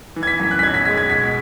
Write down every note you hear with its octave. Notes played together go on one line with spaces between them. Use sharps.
E3
G#6
B6
F#2
F#6
B6
B1 G#6
B6
G#3 B6
G#6
B2 B6